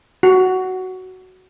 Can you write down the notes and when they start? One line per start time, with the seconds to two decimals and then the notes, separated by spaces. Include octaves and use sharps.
0.23 F#4